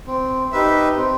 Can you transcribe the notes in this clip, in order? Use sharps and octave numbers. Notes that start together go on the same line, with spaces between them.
C4
D#4 G4 B4 E5
C4